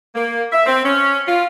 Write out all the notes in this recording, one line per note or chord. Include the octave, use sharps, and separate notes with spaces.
A#3
E5
C4
C#4
F4